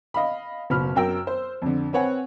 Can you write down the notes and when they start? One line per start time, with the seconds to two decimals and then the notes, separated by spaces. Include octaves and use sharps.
0.14 D#5 F5 B5
0.70 F#1 B2 B5 F6
0.96 F#2 F#3 A#4 G5 E6
1.27 C5
1.62 F2 D3
1.93 C4 B4 C#5 F#5 G#5